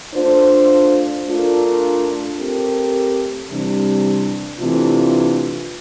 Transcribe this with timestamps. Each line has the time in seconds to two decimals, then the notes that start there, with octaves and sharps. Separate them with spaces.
0.14 A3 D4 F4 C5
1.25 A3 D4 F4 A#4
2.37 A3 C4 G4 A#4
3.49 C3 E3 G3 D4
4.60 C3 E3 A3 D4 F4